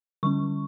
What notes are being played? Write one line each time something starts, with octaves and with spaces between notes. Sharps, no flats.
D3 G3 C#4 C#6